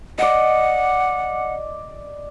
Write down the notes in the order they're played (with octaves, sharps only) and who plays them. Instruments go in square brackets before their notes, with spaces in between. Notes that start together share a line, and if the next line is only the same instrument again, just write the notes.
[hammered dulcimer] D5 D#5 [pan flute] F#5